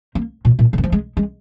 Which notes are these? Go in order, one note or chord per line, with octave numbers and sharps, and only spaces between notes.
A#3
A#2
A#2
C#3
D#3
F3
G#3
G#3